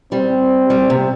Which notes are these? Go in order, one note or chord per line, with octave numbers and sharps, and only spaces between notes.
G3 C4
G3
C3